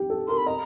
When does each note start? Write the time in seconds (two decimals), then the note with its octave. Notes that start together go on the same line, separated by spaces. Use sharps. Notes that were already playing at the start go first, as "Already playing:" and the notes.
Already playing: G4
0.10 A4
0.28 A#4 C6
0.37 B5
0.46 D#5 A#5